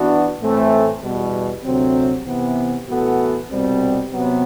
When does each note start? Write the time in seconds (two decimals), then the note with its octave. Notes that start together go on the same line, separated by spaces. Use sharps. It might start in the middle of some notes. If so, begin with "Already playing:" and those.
Already playing: E3 B3 D4 F#4
0.40 A2 E3 A3 C4
1.01 E2 B2 G3
1.63 D2 C3 F#3 C4
2.25 C3 E3 B3
2.88 A2 E3 B3 F#4 A4
3.50 C2 B2 G3 C4
4.12 C3 F#3 B3